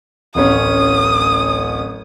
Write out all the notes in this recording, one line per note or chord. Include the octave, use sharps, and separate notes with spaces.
D1 A1 C#4 D#6